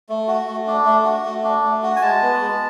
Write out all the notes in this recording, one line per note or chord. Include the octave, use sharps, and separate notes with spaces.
A3
F#4
A3
D4
A3
F#4
A3
D4
A3
F#4
G#5
G#3 A5
B3
G#3